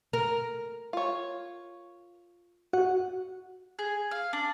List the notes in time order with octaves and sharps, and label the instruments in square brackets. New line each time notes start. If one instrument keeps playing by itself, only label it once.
[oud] A#4
[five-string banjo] F4 C#5
[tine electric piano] F#4 [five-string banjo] F#5
[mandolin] G#4
F5
D4